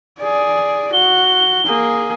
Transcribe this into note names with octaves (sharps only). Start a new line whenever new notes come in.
G#4 D5
F#4 G7
A#3 G#4